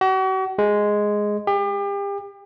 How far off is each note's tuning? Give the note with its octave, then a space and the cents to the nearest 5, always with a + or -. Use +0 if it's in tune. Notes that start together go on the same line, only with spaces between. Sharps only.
F#4 +40
G#3 +0
G4 +35